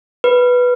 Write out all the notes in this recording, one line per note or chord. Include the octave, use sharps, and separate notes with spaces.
B4